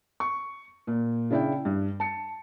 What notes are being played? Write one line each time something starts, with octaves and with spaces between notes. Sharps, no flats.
C#6
A#2
C#3 D4 E4 D5 G5
G2
A5 C#7